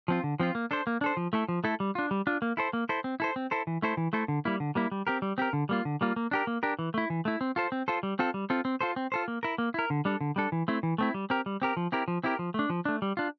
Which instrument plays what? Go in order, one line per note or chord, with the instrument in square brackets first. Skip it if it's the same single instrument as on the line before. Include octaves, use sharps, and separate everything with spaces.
[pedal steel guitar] F3 C4 F4
D3
F3 C4 F4
A#3
D4 A4 C5
A#3
D4 A4 C5
F3
A3 E4 A4
F3
A3 E4 A4
G3
D4 F4
G3
D4 F4
A#3
E4 A4 C5
A#3
E4 A4 C5
C4
E4 A4 C5
C4
E4 A4 C5
E3
A3 E4 A4 C5
E3
A3 E4 A4 C5
D3
G3 A#3 E4
D3
G3 A#3 E4
G3
C4 G4 A#4
G3
C4 G4 A#4
D3
G3 A#3 F4
D3
G3 A#3 F4
A#3
D4 G4 A#4
A#3
D4 G4 A#4
E3
A3 E4
E3
A3 E4
C4
F4 A4 C5
C4
F4 A4 C5
G3
C4 F4 A4
G3
C4 F4 A4
C4
F4 A4 C5
C4
F4 A4 C5
A#3
E4 A#4
A#3
E4 A#4
D3
G3 D4 A4
D3
G3 D4 A4
E3
A3 C4 E4
E3
A3 C4 E4
G3
C4 G4 A#4
G3
C4 G4 A#4
F3
C4 E4 G4 A#4
F3
C4 E4 G4 A#4
F3
A3 D4
F3
A3 D4
G3
D4 F4